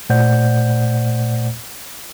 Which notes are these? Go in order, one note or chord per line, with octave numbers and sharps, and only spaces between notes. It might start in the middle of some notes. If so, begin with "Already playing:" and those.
A#2 A3 C5 D5 F#5 G6